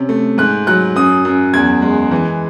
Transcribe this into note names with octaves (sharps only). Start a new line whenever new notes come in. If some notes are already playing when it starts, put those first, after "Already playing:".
Already playing: C3 C#4
A3
G#2 F#6
F#3 F#6
F#2 D#6
F#2
E2 G#6
G#3
E3